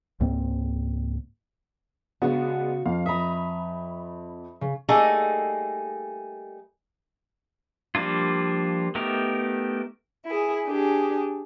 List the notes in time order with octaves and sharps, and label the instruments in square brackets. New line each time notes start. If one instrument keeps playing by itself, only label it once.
[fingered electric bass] C#2 G#2 A#3 C4
[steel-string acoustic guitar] C#3 F#4 [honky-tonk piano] G#3 B3 D4
[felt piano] F2 [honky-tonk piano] F5
[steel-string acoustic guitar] E5 A#5 [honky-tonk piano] B5 D#6
[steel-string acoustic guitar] C#3
[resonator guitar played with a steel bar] G3 A3 A#3 D#4 G#4 A4
[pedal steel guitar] F3 G3 A#3 D4 F4
A3 B3 D#4 G4 A#4
[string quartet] E4 G#4
D4 G4 G#4